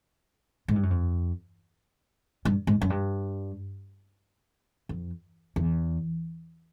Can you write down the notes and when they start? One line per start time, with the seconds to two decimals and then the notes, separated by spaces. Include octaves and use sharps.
0.68 G#2
0.76 G2
0.83 F#2
0.90 F2
2.45 G2
2.67 G#2
2.82 F#2
2.90 G2
4.89 F2
5.56 E2